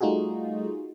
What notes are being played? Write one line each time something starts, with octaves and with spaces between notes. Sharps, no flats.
G3 A3 D#4 F4 F#4 G#4